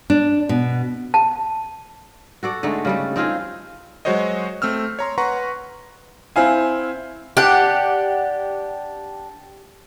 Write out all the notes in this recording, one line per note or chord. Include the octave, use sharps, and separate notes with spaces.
D4
B2
A5
F#4 A4 D5
D3 G#3 A3 D#4
C#3 G3 A4
C4 D#4 F4 G#4
F#3 G#3 F#4 C5 C#5 D#5
A3 C4 E6 F6
C#5 A#5 C6
B4 F#5 A#5 C6 C#6
C4 E4 F5 G#5
D4 G4 F#5